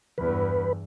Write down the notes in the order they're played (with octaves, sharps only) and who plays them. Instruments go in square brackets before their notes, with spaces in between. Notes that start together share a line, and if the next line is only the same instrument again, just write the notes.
[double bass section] E2 G2 [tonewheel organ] B4